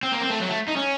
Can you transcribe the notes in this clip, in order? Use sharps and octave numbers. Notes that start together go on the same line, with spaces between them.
C4
A#3
C4
A3
F#3
A3
D#4
C#4